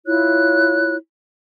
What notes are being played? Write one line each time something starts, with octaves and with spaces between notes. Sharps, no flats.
E4 F4 C#5 F#6